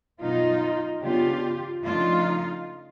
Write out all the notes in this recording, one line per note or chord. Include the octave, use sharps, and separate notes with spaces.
B2 F#3 B3 D#4 F4
C#3 F#3 B3 D4 F4 G4
C#3 F3 A3 D4 D#4 F4